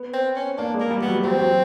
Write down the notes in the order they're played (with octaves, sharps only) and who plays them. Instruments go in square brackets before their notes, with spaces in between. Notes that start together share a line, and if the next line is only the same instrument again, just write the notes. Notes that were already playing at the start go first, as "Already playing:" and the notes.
Already playing: [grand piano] B3
[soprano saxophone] C4
C#4
[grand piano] A#3 [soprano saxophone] D4
[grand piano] G#3
[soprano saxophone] A#3
[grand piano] G3
[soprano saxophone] B3
[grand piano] F#3
[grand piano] F#3 [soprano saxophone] C4
[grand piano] F#3